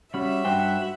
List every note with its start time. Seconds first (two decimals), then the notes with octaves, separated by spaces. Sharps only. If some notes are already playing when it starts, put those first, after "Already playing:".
0.14 G3 C#4 F#4 E5 B5
0.45 G2 C5 F#5 G5